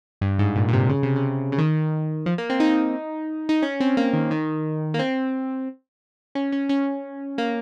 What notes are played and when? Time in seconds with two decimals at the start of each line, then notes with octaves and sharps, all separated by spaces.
0.21 G2
0.39 G#2
0.56 A#2
0.68 A#2
0.73 C3
0.89 C#3
1.03 C3
1.16 C#3
1.52 C#3
1.58 D#3
2.26 F3
2.38 A#3
2.50 C4
2.60 D#4
3.49 D#4
3.62 C#4
3.80 C4
3.97 A#3
4.13 D#3
4.31 D#3
4.94 A#3
4.99 C4
6.35 C#4
6.52 C#4
6.69 C#4
7.38 A#3